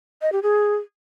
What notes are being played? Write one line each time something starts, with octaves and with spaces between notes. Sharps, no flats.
D#5
G4
G#4